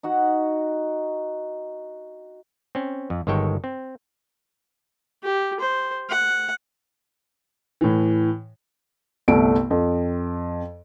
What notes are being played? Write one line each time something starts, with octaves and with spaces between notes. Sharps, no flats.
D#4 F#4 F#5
C4 C#4
F2
G1 D#3 G#3 A4 C#5 G5
C4
G4
C5
F#5
A2 E3
G1 C2 C3 A3 D7
F2